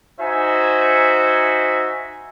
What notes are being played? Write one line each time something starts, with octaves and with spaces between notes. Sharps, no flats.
D#4 F#4 C5 E5 G#5